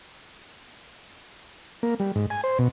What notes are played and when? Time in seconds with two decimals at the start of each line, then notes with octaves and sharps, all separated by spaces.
1.83 A#3
2.00 G3
2.16 G#2
2.30 G#5
2.44 C5
2.59 B2